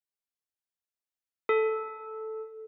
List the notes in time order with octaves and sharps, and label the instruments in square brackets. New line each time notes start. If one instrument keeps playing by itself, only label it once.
[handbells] A4